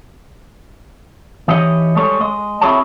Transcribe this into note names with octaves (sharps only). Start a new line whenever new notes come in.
E3 D#4 G4 C#5 D#5
G3 G#3 A4 C#5
G#3 D#5
C4 E4 F#4 G#4 C#5 A5